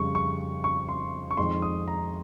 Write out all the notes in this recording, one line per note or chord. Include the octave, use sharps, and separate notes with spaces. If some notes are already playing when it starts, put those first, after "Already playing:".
Already playing: F2 C#3 G3 C#6
C#6
C#6
C6
C#6
F2 D#3 G#3 C6
D#6
A#5